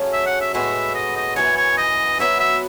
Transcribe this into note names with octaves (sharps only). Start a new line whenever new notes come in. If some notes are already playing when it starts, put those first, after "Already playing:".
Already playing: F#2 C#3 F#3 A3 C#4
E5
F#5
E5
A2 G#3 B3 F#4 E5
D#5
D#5
F#2 E3 B3 C#5
C#5
D#5
B2 F#3 B3 F#4 E5
E5